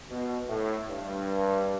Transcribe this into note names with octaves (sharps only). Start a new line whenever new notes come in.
B2
A2
G2